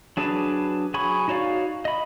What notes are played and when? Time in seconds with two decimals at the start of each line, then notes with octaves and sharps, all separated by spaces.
0.17 F#3 D4 G#4 B4 A5
0.94 F#3 G#4 G#5 B5 C#6
1.28 D#4 F#4 C#5 D5 F5
1.85 D#5 B5